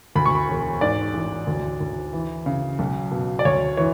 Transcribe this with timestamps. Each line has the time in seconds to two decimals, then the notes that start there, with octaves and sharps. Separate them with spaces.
0.16 D2 B5
0.26 C#6
0.35 B5
0.49 E1
0.81 G#2 D5
1.14 A1
1.47 D2
1.81 D2
2.13 E3
2.46 C#3
2.79 B1
3.12 B2
3.39 D5
3.45 D2 C#5
3.77 E3 C#5